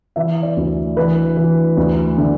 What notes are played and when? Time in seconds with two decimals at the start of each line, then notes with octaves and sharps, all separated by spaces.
0.16 E3 E5
0.43 D5
0.57 D2
0.96 E3 B4
1.37 E3
1.77 D2
2.18 D3